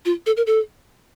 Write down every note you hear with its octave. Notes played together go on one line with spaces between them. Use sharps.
F4
A4
A#4
A4